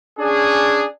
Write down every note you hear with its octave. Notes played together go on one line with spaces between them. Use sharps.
C#4 D4 G#4